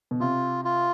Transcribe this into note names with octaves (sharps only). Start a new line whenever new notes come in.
B2
C3 F4
F4